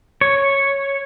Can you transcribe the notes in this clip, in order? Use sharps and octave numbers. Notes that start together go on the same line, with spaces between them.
C#5